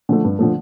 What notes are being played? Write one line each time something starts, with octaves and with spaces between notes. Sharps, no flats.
D3 F3 A3
G2
D3 F3 A3